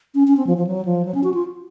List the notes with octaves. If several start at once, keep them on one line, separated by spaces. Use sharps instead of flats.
C#4
C#4
C4
F3
F3
F#3
F3
F#3
C#4
F#4
F4